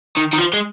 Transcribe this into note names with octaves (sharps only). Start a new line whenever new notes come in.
D#3
D#3
F3
G#3